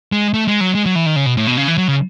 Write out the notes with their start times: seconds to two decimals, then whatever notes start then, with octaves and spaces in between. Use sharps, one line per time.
0.12 G#3
0.34 A3
0.48 G#3
0.61 F#3
0.75 G#3
0.86 F#3
0.95 E3
1.06 D#3
1.16 C#3
1.26 B2
1.37 A2
1.47 B2
1.57 C#3
1.68 E3
1.78 F#3
1.88 C#3